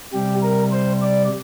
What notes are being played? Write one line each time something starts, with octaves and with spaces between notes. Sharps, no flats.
C3 G3 G4
A#4
C5
D5